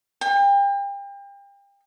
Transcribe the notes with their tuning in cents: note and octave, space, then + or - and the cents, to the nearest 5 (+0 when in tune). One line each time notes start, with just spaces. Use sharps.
G5 +35